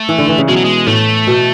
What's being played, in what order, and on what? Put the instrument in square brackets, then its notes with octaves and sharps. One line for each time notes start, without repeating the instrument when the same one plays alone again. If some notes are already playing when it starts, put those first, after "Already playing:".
Already playing: [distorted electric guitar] A3
[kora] E3
D3
E3
C#3
[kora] B2 [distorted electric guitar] G#3
[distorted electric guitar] F#3
G#3
[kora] A2 [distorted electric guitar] A3
[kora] B2